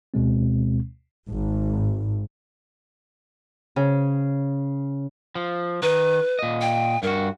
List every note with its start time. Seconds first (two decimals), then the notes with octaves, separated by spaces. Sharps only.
0.14 D2 B2 G#3 C4
1.29 G#1
3.76 C#3
5.35 F3
5.83 D#3 B4
6.39 A#2 D#5
6.61 G5
7.03 G2 F#4 A#4